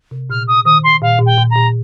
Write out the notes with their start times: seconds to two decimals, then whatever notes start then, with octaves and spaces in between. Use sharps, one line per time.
0.11 C3
0.30 A#2 F6
0.47 D#6
0.65 D#3 D#6
0.83 C6
1.02 A#2 F5
1.19 A#2
1.26 G5
1.38 A#2
1.50 A#5
1.56 A#2